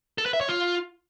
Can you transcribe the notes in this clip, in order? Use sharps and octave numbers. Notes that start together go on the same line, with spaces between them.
A4
B4
E5
C#5
F4